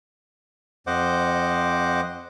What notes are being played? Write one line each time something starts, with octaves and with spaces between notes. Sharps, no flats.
F2 C5 D#5 F#5 D6